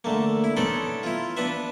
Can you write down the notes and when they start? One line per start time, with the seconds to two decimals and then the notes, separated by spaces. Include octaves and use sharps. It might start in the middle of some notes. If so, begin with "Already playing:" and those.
0.04 D3 A3 A#3
0.44 E4
0.57 B3 C#4 D#4 A4 D5 C6
1.03 E4 F4
1.37 B3 D4 B4 E5